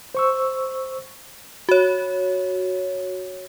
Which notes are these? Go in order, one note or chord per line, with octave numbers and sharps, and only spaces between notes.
C5 C#6 E6
F#4 C#5